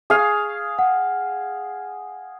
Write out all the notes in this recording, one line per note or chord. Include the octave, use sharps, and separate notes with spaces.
G#4 F5 C#6
F#5